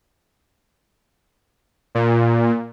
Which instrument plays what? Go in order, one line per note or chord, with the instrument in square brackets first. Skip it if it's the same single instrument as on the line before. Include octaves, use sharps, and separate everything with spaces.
[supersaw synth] A#2